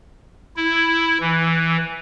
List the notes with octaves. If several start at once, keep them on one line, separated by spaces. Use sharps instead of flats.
E4
E3